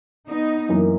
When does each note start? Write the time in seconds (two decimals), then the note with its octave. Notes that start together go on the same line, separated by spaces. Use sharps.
0.29 B3 D#4
0.69 F#2 E3 A#3